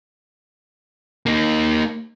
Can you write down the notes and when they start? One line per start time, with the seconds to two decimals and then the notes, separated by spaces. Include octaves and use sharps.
1.26 A#3 D#4